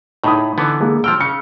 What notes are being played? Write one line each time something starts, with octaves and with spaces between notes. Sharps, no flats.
A2 D#4 B5 D#6
D3 E3 B3
G#3 A#3
F3 G5 E6 F6
C#3 C#7